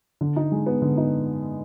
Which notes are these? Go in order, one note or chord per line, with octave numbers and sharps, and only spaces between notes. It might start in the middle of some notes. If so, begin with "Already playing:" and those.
D3
D#4
G#3
B3
D3
D#4